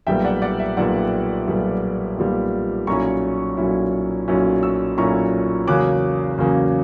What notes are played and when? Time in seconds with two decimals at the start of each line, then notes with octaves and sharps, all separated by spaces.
0.07 B1 A#2 G3 B3 E5 G5
0.24 D5 F#5
0.42 D5 F#5
0.59 E5
0.77 B1 A#2 G3 B3 D5 F#5
1.48 B1 A#2 G3 B3
2.18 B1 A#2 G3 B3
2.87 B1 A#2 F#3 C#4 E4 A#5 C#6
3.57 B1 A#2 F#3 C#4 E4
4.28 B1 A#2 F#3 C#4 E4
4.63 C#6 E6
4.98 B1 A#2 F#3 C#4 E4 A#5 C#6
5.67 E2 C#3 F#3 A#3 C#4 D6 F#6
6.38 E2 C#3 F#3 A#3 C#4